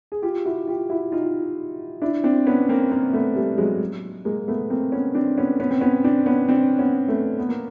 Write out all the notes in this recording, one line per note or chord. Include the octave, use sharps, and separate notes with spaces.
G#4
F4 G4
E4 F#4
F4 G4
E4 F#4
D#4 F4
D4 E4
C4 D4
B3 C#4
A#3 C4
A#3 C4
A3 B3
G3 A3
F#3 G#3
G#3 A#3
A3 B3
A#3 C4
B3 C#4
C4 D4
B3 C#4
B3 C#4
C4
B3 C#4
C4 D4
B3 C#4
C4 D4
B3 C#4
A3 B3
B3
A#3